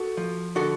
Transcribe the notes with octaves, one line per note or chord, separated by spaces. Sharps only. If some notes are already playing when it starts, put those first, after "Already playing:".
Already playing: F#4 A4
F3
D3 F#4 A4